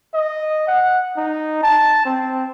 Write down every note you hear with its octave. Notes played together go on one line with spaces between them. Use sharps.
D#5
F#5
D#4
A5
C4